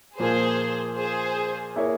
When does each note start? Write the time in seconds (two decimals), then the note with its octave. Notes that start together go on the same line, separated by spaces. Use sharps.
0.19 A#2 F3 A#3 G#4 C5
0.97 G#4 C5
1.76 A#3 E4 G#4 C#5